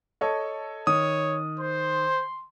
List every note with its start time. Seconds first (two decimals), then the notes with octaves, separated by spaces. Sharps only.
0.21 A4 C#5 D#5
0.87 D#3 C#5 D#6
1.60 C5 C6